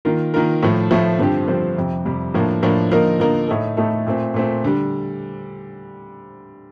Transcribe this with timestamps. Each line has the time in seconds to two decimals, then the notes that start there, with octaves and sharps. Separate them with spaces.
0.05 D#3 A#3 F4 A#4
0.34 D#3 A#3 F4 A#4
0.63 A2 F3 A3
0.91 A2 F3 A3
1.19 G2 D3 F3 C4 G4
1.48 G2 D3 F3 C4 G4
1.76 F2 C3 G3
2.05 F2 C3 G3
2.34 A2 F3 A#3 D4
2.62 A2 F3 A#3 D4
2.91 D3 F3 A#3 D#4 A#4
3.20 D3 F3 A#3 D#4 A#4
3.48 A2 A3 D#4 A4
3.77 A2 A3 D#4 A4
4.06 A#2 A3 C4
4.34 A#2 A3 C4
4.64 D3 G3